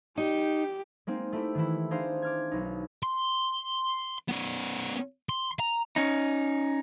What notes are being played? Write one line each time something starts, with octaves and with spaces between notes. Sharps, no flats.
D#4 G4
G#3 A#3 C4 D#4
A3 E4 G4
D#3 E3 E4
D4 D#4 G#4 C5 F5 C6
D6 F6 G#6
B1 D#4
C6
B3 C#4
C6
A#5
C#4 D#4